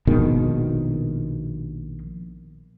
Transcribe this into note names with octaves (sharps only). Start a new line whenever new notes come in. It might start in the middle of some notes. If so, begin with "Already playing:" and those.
A#1 B2 D#3 G#3